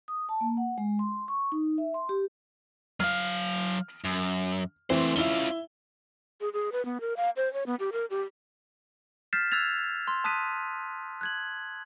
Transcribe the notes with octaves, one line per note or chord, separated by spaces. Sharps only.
D#6
A5
A#3
F#5
G#3
C6
C#6
D#4
E5
C6
G4
F#3 F5 F6
F#2
E3 A3 C4 C5
C#4 E4 F4 G7
G#4
G#4
B4
B3
A#4
F5
C5
C#5
B3
G4
A#4
G4
F6 G6 A6 B6 C7 E7
E6 F#6 G#6 A6 F7
C6
A5 D#6 F#6 B6 D#7
F#6 G#6 F#7